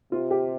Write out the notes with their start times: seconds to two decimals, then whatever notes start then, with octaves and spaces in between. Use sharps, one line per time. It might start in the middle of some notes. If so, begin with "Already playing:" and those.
0.12 C3 F4
0.31 G4